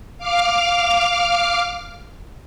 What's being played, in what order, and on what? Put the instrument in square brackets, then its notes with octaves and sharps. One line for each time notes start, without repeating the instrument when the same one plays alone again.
[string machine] F5 D6 F6